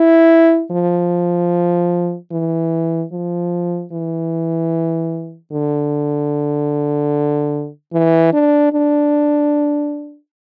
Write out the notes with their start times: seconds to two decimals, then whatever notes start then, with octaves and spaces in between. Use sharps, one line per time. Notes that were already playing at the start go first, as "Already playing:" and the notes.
Already playing: E4
0.71 F3
2.32 E3
3.12 F3
3.92 E3
5.52 D3
7.93 E3
8.33 D4
8.73 D4